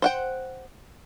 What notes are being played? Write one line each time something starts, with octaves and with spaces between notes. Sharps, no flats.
C5 F#5 G5